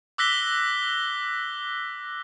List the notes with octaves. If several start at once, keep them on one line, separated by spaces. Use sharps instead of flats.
D6 E6 F#6 A#6 B6 G7